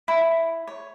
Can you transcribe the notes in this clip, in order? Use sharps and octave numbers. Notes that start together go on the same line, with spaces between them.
E4
C#5